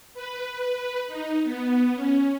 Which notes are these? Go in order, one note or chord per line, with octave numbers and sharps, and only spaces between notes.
B4
D#4
B3
C#4